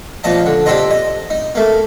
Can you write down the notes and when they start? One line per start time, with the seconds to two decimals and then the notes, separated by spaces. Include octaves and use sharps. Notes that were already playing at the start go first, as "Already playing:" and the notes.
0.24 A#2 F3 D#5 A5
0.46 D3
0.66 D4 G4 A4 C5 D#5
0.91 D#5
1.30 D#4
1.55 A3 A#3